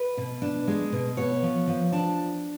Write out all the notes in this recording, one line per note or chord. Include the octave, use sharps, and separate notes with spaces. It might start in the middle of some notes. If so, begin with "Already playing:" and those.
Already playing: B4
B2
D4
G#3
B2
B3 C#5
F3
F3
D4 A5